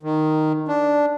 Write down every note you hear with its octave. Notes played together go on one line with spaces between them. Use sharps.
D#3
D4